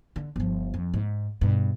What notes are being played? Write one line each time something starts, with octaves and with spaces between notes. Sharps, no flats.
D3
G1 F3
F2
G#2
G2 B2